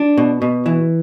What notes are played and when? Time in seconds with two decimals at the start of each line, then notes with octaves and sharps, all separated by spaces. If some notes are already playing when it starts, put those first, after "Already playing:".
Already playing: D4
0.17 B2
0.42 B2
0.66 E3